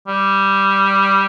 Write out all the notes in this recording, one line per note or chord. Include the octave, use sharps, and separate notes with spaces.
G3